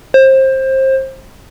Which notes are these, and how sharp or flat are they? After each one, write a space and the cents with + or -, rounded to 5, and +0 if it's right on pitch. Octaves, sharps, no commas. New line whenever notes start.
C5 +25